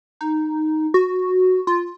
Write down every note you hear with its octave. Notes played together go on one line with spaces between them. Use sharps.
D#4
F#4
F4